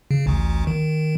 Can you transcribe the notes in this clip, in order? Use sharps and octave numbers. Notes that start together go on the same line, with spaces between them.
C#3
A1 D2
D#3